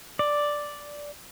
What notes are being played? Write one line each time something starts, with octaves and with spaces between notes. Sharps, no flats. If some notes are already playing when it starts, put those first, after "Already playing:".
D5